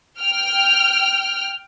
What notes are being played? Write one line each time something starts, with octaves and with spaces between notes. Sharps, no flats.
G5 F6